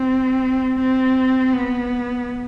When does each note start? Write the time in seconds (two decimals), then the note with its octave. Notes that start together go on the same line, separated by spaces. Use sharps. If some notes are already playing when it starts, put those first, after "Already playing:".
Already playing: C4
0.79 C4
1.53 B3